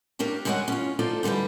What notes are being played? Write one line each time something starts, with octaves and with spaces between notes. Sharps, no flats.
G3 A#3 D4 G4 C#5
F#2 G3 G#3 C#5 D#5 F#5
C#4 F4
D#4 F4 A4 C5 D5
G#2 D3 G3 G4 B4